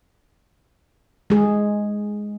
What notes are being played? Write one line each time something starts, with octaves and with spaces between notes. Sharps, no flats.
G#3 G#4